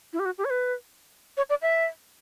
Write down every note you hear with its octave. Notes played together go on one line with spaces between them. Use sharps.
E4
G4
F#4
G4
C#5
B4
C#5
D5
E5